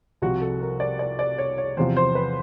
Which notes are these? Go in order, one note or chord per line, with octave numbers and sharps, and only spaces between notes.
C2 C3 F3 F#4
A4
A#4
D5
D5
D5
C#5
C#5
E2 C3 F3 C5
C5
B4